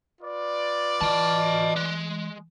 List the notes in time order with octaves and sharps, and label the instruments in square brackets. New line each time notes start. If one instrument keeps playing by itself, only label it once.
[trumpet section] F4 B4 D5
[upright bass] E3 [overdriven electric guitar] D#5 A5
[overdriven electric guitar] G#3